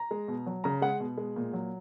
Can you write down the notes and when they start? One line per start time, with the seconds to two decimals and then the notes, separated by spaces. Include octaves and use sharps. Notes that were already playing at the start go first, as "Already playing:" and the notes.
Already playing: A#5
0.11 G#3
0.28 B2
0.46 F#3
0.64 C#3 A#5
0.82 G#3 F#5
1.00 B2
1.17 G#3
1.36 A#2
1.53 F#3